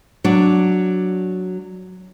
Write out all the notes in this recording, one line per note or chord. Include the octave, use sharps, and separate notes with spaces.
F#3 D4